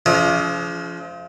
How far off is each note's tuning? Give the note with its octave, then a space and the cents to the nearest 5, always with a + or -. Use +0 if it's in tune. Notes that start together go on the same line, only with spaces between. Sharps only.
F3 -20 G#3 +35 C#4 +45